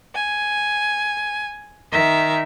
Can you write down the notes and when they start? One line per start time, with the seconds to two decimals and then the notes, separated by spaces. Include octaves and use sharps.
0.15 G#5
1.92 D#3 E5